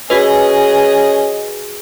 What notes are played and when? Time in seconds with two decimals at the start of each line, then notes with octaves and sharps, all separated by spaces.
0.10 C#4 F#4 G#4 B4 D#5